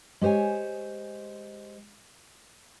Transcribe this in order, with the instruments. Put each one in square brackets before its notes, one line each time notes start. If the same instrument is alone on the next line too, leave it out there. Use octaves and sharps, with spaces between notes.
[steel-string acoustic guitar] G#3 G4 C5 C#5 G#5